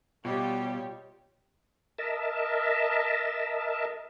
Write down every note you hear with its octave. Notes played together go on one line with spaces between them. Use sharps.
B2 G3 F4 G4 C#5 D#5
A#4 D#5 E5 A5